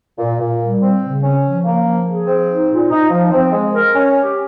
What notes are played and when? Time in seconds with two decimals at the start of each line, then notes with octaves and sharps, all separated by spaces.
0.18 A#2
0.39 A#2
0.61 G3
0.81 C4
1.02 C#3
1.23 C#4
1.44 F3
1.65 A#3
1.85 F3
2.06 G#4
2.27 C4
2.48 D#4
2.69 A#2
2.90 D#4
3.11 F3
3.32 C4
3.53 G#3
3.73 A#4
3.94 C#4
4.15 G4